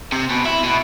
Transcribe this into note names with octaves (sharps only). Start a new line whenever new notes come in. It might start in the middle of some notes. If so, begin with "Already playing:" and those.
C3
B2
E4
B2